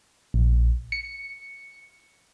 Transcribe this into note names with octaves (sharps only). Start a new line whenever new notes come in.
A#1
C#7